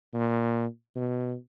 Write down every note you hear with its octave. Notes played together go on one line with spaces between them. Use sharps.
A#2
B2